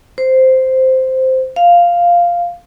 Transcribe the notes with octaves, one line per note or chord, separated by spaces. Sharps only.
C5
F5